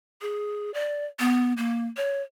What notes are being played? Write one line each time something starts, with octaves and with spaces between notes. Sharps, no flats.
G#4
D5
B3
A#3
C#5